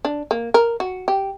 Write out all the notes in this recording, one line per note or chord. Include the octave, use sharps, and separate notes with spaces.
D4
A#3
A#4
F#4
G4